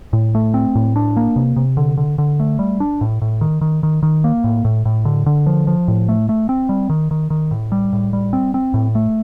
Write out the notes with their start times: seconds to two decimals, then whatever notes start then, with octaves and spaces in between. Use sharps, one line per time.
0.13 A2
0.35 A3
0.54 C4
0.75 A2
0.96 D4
1.17 A#3
1.36 C3
1.56 C3
1.77 D3
1.97 D3
2.18 D3
2.40 A3
2.59 G3
2.80 D4
3.01 A2
3.22 A2
3.41 D#3
3.61 D#3
3.83 D#3
4.03 D#3
4.24 A#3
4.44 A2
4.65 A2
4.85 A2
5.05 D3
5.26 D3
5.46 F3
5.67 F3
5.88 A2
6.09 A3
6.29 A3
6.49 C4
6.69 G3
6.90 D#3
7.11 D#3
7.30 D#3
7.51 A2
7.72 G3
7.93 A2
8.13 G3
8.33 C4
8.54 C4
8.74 A2
8.95 A3